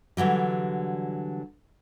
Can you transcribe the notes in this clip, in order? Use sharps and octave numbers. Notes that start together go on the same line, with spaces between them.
D3 E3 F#3 G3